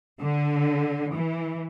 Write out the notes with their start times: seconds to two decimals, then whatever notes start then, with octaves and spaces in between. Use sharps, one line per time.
0.19 D3
1.13 E3